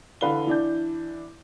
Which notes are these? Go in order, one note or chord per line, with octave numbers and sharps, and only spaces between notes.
D3 E3 B4 F5 G7
E3 D4 G6